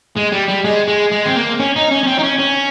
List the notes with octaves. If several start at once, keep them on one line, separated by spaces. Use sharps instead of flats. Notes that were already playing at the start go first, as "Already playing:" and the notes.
G#3
G3
G3
G#3
G#3
G#3
C4
A#3
C#4
D#4
C#4
C#4
C4
D#4
C#4
C#4